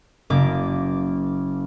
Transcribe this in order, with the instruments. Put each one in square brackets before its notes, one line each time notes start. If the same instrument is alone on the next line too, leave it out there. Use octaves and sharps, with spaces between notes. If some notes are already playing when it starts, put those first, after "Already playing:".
[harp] F#1 A#3 D6